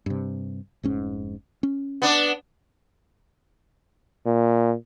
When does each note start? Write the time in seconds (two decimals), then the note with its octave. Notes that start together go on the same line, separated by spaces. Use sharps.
0.06 G2 C3
0.83 F1 G#2 C#4
1.63 C#4
2.02 B3 D4
4.26 A#2